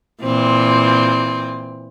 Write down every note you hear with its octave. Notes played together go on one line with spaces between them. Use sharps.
A#2 E3 C4